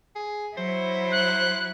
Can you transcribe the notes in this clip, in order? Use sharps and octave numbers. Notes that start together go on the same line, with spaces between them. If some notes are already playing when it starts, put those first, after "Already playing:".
G#4
F#3 E4 C5
F#6